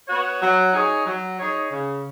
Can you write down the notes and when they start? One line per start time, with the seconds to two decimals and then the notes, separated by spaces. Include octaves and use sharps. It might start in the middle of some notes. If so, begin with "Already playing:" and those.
0.08 B3 F#4 C#5
0.41 F#3
0.73 D#4 G#4 C#5
1.06 F#3
1.37 D#4 G#4 C#5
1.71 C#3